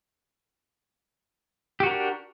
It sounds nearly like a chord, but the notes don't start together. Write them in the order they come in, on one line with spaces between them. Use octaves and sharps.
G4 F#4 A#4 D4